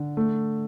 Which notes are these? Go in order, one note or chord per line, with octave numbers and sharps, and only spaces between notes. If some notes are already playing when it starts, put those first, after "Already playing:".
Already playing: D3
A3